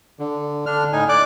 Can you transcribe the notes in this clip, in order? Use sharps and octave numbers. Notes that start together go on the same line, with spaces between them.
D3
D3 D4 F6
A2 D#4 G#5
D5 D6 F#6